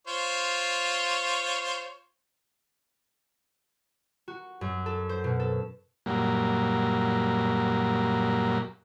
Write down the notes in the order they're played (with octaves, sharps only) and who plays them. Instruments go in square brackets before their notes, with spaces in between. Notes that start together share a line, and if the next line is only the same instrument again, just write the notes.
[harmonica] F4 C5 C#5
[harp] F#4
F#2
A4
C5
B2
A4
[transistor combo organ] F#2 A#2 F#3 G3 A#3